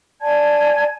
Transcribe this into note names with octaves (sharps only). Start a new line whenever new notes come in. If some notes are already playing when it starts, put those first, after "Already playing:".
D5 G#5 A5 G#6